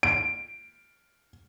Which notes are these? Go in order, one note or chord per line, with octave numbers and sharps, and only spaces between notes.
D7